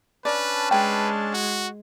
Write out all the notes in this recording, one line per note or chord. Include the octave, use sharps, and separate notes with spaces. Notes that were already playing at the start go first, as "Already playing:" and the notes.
C#4 D4 B4 D5 A5
G#3 B4 G5
F#4